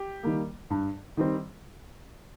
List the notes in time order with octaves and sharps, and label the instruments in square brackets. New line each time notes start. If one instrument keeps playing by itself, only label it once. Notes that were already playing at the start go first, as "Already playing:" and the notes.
Already playing: [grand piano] G4
D#3 G3 A#3
G2
D#3 G3 C4